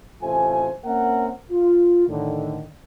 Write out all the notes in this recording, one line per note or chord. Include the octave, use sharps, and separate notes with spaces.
A1 C3 A3 F4 C5 G#5
A#3 C4 C#4 A#4 E5 F#5
F4
A2 D3 D#3